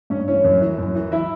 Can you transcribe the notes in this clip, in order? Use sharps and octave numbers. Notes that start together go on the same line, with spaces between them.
G2 C#4 C#5
E3 C#4 C#5
F#2
E3
F#2
E3
E4 E5